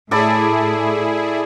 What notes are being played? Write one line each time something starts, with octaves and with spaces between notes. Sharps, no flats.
A2 E4 G#4 A4 D5 B5